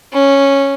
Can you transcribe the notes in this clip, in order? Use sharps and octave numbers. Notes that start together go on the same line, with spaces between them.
C#4